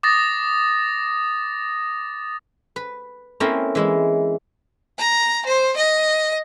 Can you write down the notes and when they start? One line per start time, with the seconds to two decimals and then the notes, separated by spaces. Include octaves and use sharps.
0.03 D6 D#6 A6 A#6
2.76 B4
3.40 A#3 C4 C#4 E4 A4 A#4
3.75 E3 G#3 E4
4.99 A#5
5.46 C5
5.76 D#5